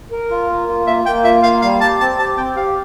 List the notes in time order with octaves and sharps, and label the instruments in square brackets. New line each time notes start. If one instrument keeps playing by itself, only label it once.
[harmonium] A#4
F4
A#3
F4
[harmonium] A#3 [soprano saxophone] E5
[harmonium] A#3 [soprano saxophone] G5
[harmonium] F4 [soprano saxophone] E5
[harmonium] A#3 [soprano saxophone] F5
[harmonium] G3 [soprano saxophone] F5
[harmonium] G4 [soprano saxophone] A5
[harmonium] C4 [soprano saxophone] A5
[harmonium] G4 [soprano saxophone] A5
[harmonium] C4 [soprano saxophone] G5
[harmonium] G4 [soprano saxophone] F5